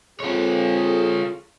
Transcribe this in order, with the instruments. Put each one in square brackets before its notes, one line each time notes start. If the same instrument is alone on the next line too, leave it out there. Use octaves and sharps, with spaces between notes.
[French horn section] C4 G#4 A4 [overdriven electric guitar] F4 C#5